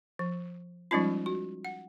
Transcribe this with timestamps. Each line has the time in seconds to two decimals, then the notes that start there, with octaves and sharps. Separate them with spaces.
0.19 F3
0.91 F3 G3 G#3 C#4 D#4 F4
1.26 F#4
1.65 F#5